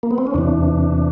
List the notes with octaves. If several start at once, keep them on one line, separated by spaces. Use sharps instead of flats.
A#3
B3
C4
C#4
E2 C3 E3 D4